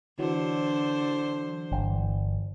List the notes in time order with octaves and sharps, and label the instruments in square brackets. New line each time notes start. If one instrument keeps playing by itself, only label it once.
[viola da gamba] D3 C5 [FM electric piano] E3 F#3
[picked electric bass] G1